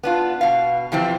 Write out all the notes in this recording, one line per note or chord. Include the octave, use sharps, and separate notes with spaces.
B3 D4 F4
B2 F5
C3 E3 F3 C4